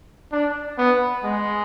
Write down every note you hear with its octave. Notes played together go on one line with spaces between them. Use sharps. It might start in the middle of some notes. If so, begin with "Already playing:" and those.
D4
B3
G#3